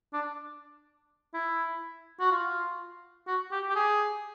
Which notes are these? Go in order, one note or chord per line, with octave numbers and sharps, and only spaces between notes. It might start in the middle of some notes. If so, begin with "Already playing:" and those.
D4
E4
F#4
F4
F#4
G4
G4
G#4